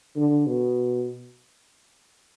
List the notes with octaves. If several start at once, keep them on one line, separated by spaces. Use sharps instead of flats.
D3
B2